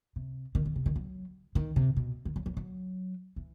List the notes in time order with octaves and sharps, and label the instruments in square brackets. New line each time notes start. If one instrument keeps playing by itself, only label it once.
[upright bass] C3
D#3
D#3
C3
D#3
F#3
D#3
C3
B2
D#3
F#3
F#3
F#3
E3